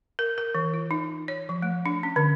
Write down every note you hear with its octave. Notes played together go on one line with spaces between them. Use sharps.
A#4
A#4
E3
F4
D#4
C#5
F3
A3
D4
C#4
D3